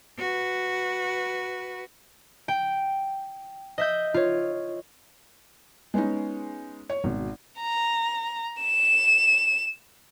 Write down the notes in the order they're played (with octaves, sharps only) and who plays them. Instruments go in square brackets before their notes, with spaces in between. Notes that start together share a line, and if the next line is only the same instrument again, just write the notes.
[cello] F#4 B4
[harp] G5
D#5 E5 G6
F4 C#5
[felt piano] G#3 B3 C#4 D#4
C#5
G#1 B2
[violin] A#5
E7